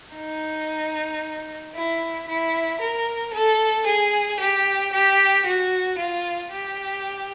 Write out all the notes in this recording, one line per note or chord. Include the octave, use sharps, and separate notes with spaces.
D#4
E4
E4
A#4
A4
G#4
G4
G4
F#4
F4
G4